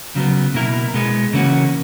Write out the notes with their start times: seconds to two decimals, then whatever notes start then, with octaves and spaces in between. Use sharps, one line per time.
0.15 C#3 F#3 B3
0.54 B2 A#3 E4 A#4
0.94 B2 G#3 B3
1.33 C#3 E3 A#3 C#4 F#4